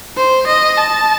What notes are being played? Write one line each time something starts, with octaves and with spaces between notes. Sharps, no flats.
C5
D#5
A5